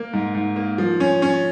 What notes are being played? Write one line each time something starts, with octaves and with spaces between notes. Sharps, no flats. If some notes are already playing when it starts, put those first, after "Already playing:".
Already playing: A#3
G#2
G#2
A#3
F3
C#4
C#4